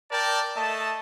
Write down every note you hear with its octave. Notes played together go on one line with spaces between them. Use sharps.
A#4 D5 G5 A5
A3 D#5 A5